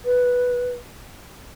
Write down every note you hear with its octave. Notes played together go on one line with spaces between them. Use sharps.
B4